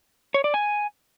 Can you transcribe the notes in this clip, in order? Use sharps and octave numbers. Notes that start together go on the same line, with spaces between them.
C#5
D5
G#5